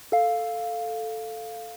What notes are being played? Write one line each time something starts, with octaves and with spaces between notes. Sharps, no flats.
A4 F5